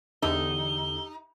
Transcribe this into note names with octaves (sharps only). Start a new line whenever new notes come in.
E2 D3 D#4 G4 E6 G7